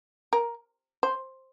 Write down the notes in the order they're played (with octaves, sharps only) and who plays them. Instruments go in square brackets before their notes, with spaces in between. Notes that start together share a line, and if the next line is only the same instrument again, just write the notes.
[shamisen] A#4
C5